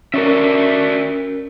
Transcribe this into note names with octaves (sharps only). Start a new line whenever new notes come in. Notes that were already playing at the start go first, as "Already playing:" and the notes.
C#4 F#4 A#4 D5 E5